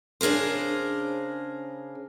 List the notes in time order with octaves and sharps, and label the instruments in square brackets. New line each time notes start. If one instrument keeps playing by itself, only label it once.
[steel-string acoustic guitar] C#3 D4 G#4 A#4 C5